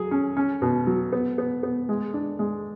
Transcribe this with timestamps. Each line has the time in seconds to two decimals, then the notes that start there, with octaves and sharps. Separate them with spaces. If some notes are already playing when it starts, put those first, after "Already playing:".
Already playing: F#3 G#4
0.11 C#4
0.37 C#4
0.62 B2
0.87 F#3
1.13 B3
1.38 B3
1.63 B3
1.89 G#3
2.14 D4
2.39 G#3